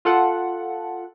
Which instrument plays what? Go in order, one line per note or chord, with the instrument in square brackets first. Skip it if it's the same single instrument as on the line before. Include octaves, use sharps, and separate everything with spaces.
[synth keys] F4 A4 F#5